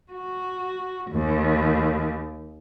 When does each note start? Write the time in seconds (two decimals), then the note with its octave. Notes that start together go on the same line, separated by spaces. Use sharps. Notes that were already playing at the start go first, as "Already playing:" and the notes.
0.12 F#4
1.11 D#2